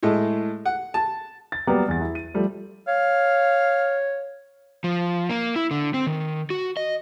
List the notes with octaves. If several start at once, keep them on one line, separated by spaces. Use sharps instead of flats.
A2 G#3 A3
F#5
A5
A6
F#3 G3 A#3 B3 G4 D5
E2 A6
E4
D#7
F3 G3 A3
C#5 F5
F3
A#3
E4
D3
C4
D#3
F#4
D#5